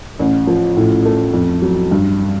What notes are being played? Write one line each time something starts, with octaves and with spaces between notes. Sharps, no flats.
A1
F3
A2
A3
F2
F#3
G2